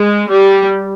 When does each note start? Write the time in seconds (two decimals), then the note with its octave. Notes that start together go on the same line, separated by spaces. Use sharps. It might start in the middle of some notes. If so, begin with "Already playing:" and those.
Already playing: G#3
0.31 G3